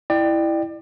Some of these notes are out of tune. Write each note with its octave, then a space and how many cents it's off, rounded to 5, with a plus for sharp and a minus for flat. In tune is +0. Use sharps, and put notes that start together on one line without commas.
E4 +0 D5 +30 G5 +0